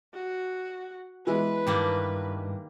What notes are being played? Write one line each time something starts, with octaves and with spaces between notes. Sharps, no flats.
F#4
E3 G#3 B3 B4
G2 D#3 G3 A#3